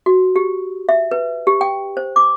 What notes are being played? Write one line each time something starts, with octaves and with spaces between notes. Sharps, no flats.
F#4
G4
E5
B4
G4
G5
C5
D6